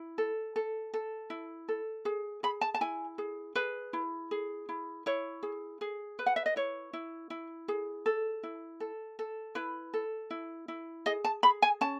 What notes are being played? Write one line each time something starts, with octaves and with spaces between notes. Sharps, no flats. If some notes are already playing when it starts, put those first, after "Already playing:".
Already playing: E4
A4
A4
A4
E4
A4
G#4
G#4 B5
A5
A5
E4 G#5
G#4
G#4 B4
E4
G#4
E4
E4 C#5
G#4
G#4
B4
F#5
E5
D#5
E4 C#5
E4
E4
G#4
A4
E4
A4
A4
E4 B4
A4
E4
E4
G#4 D#5
A5
G#4 B5
G#5
C#4 A5